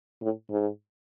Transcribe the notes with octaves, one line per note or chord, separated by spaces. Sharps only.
A2
G#2